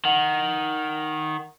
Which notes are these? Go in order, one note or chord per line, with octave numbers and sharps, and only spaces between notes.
D#3 F#5